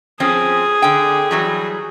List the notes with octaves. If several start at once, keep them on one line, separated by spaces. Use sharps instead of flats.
F3 C4 C#4 G#4
D3 G5
E3 F#3 G3